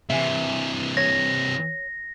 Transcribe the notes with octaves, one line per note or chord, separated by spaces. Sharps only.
C3 E3 E5 G#5
C#5 A#6